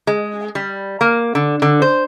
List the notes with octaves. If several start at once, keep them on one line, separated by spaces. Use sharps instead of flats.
G#3
G3
A#3
D3
D3
C5